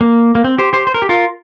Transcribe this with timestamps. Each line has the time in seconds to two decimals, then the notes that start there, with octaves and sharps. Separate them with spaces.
0.01 A#3
0.35 A#3
0.44 C4
0.58 G4 C5
0.73 G4 C5
0.87 C5
0.94 A#4
1.02 G4
1.09 F4 A#4